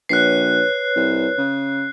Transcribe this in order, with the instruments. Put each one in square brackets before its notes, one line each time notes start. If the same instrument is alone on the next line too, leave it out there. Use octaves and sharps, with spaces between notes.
[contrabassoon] A#1 [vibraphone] B4 C#5 [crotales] F#6 C7
[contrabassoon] C2
C#3